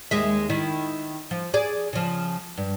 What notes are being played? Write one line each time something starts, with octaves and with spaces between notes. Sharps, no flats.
D#2 G#3 E5
D#3 E4
F3
G#4 D5
C#3 F3
G2